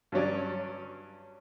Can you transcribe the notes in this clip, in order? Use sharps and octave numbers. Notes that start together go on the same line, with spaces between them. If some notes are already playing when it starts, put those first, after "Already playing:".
G2 F#3 C#4 D5